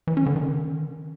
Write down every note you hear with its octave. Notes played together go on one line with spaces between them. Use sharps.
E3
C#4
D3
D#3